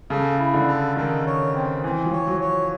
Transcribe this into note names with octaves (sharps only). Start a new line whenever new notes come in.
C#3 A4
E4
D3
A4
D#3 A4
C#5
C4
E3 C4
F3
C#5
F#3
C#5